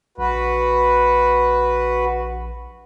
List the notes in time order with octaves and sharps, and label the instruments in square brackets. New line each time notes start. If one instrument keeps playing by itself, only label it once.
[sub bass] A#1 [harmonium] F#4 B4